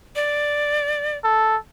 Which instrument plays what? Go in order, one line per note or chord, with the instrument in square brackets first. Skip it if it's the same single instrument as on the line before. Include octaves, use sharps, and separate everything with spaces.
[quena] D5
[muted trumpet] A4